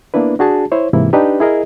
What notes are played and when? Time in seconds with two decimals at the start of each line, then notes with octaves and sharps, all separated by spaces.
0.14 A#3 B3 D4 E4 B4
0.39 D4 F#4 G#4 A5
0.72 E4 C5 C#5
0.93 G#2 C3 E3 A#3 E4
1.13 D4 D#4 G4 B4
1.40 E4 G#4 A#4 D#5